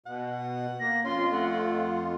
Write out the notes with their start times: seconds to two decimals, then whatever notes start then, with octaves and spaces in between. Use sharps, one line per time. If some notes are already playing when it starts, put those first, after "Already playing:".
0.06 B2 F#5
0.80 A#3 A#6
1.05 F2 C#4 F4 C6
1.32 A3 F#5